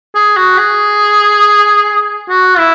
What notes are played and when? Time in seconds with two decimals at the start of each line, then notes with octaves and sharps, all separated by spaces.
0.15 G#4
0.37 F#4
0.58 G#4
2.29 F#4
2.58 E4